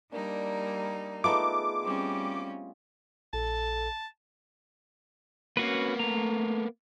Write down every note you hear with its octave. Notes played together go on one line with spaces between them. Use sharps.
G3 A#3 D4 D#4
A3 B3 D#4 F4 G#4 D6
G3 C4 C#4
A#1 A4 A5
A#3 B3 C#4 F#4 B4
A3 A#5